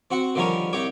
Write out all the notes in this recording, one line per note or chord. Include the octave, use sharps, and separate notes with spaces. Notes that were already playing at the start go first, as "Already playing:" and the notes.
C4 F#4 F#5
D3 D#3 F3 G3 A#4 C#5
C2 G4 C#5 D6